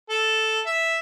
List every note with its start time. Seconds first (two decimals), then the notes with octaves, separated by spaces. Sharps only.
0.10 A4
0.66 E5